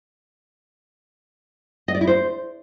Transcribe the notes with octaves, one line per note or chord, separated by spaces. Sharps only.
D#5
D5
E4
C5